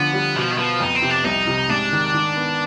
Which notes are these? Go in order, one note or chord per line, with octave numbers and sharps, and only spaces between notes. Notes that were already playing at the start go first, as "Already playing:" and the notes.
Already playing: D3 F3 B3
G3
B2 F3
D#3
F3 B3
F2 D#4
C4
C3
D4
C2 D#4
C3
G#2 D4
D#3
D#3
B3